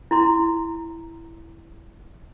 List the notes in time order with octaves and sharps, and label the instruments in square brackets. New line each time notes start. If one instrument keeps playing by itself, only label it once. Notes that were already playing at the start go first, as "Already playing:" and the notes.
[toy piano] E4 A#5 C6